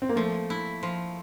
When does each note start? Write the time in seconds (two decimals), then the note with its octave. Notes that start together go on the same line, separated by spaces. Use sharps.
0.02 C4
0.09 A#3
0.16 F3 A3
0.50 E4
0.83 F3